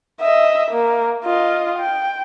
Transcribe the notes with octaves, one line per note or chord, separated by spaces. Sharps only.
D#5 E5
A#3
F4 D#5
G5